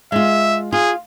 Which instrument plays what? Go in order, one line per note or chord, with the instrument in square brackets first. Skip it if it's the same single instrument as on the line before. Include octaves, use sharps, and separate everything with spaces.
[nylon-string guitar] G#3 F4 [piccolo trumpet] E5
[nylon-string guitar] F4 [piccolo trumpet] G#4